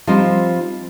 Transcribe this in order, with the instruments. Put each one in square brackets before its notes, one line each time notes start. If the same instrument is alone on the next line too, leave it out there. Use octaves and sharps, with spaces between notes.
[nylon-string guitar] F3 G3 C4 D#4 F4 C5